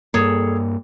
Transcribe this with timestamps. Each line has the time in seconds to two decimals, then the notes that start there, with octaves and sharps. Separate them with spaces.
0.14 G2 A#3 G#4 A4 C#5